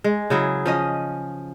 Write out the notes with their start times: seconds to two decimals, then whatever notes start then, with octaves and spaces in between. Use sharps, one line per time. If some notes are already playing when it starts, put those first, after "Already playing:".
0.04 G#3
0.30 C#3 F#3 E4 G#4
0.65 F3 C#4 D#5